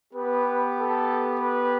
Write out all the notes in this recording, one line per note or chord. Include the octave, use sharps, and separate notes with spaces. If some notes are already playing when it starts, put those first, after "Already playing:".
B3 G4 B4
A4
B4